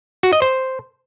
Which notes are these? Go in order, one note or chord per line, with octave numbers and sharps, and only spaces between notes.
F#4
D#5
C5